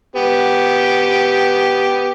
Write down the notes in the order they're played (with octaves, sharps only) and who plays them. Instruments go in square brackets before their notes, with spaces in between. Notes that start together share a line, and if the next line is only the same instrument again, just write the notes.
[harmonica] B3 G4